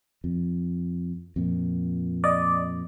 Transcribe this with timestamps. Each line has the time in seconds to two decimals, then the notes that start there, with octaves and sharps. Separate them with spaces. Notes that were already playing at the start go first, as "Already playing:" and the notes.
0.24 F2
1.36 F2 A#2
2.24 D5 D#5